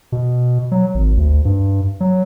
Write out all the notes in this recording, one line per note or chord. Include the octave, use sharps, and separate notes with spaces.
B2
F#3
G#1
D2
G2
F#3